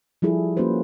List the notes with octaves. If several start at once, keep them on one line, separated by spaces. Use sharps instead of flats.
F3 G3 E4 G#4 A4
A#3 C#4 F#4 B4 C5